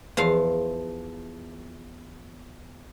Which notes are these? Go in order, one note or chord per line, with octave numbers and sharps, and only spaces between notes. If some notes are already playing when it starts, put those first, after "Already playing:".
E2 F3 F5